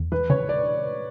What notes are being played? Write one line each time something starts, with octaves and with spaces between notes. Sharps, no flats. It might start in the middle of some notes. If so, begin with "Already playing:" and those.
Already playing: E2
E3 B4
C#3 C#5
D5